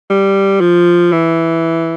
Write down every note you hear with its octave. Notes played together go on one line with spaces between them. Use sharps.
G3
F3
E3